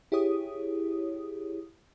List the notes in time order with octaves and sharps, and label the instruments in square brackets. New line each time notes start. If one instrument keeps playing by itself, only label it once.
[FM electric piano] E4 G4 G#4 C#5 D#6